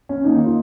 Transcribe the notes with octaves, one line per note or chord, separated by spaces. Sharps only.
C#4
D#3 A#3 D#4
D#4
F4